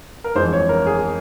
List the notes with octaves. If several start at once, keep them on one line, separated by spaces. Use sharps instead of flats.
A#4
G1 F2 E3 G#3 C5
C#5
A#4
G#4